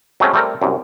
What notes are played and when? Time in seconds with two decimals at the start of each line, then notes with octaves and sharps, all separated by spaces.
0.20 F#3 G#3 A3 C4 C#4
0.34 G3 A3 C4 A4 A#4
0.62 C2 F#2